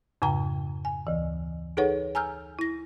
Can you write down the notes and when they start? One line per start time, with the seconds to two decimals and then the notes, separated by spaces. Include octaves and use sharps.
0.22 F2 G#2 C#3 G5 A#5
0.85 G#5
1.07 D2 E3
1.77 D#4 G#4 A4 B4 C#5 F#5
2.15 G#5 A#5 E6 F6 G6
2.59 E4 A#6